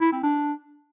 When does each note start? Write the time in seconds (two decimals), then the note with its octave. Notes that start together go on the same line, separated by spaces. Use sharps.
0.01 E4
0.12 C4
0.23 D4